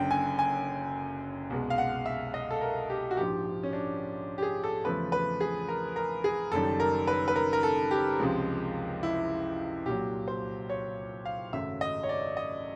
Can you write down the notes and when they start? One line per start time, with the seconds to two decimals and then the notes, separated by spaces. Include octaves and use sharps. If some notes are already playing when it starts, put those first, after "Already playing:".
Already playing: F#1 F#2 D3 G5
0.11 G#5
0.39 G#5
1.50 C2 B2 G#3
1.70 F5
1.78 F#5
2.06 E5
2.34 D#5
2.51 A4
2.61 A#4
2.90 G4
3.11 F#4
3.17 A#1 G#2 F3 G4
3.63 C#4
3.73 D4
4.38 G4
4.42 G#4
4.64 A4
4.84 E2 C#3 F3 A3 B4
5.12 B4
5.40 G#4
5.68 A#4
5.96 A#4
6.24 G#4
6.52 F#1 F#2 D#3 G3 A4
6.80 A#4
7.07 B4
7.28 B4
7.36 A#4
7.53 A#4
7.63 A4
7.91 G4
8.19 C#2 C3 F3 G#3
9.03 E4
9.86 C2 A#2 F#3 G4
10.28 C5
10.69 C#5
11.25 F5
11.53 G#1 F#2 C#3 F#3 A3 E5
11.81 D#5
12.03 C#5
12.09 D5
12.37 D#5